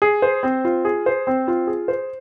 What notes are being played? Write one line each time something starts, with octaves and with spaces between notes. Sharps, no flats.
G#4
C5
C4
F4
G#4
C5
C4
F4
G#4
C5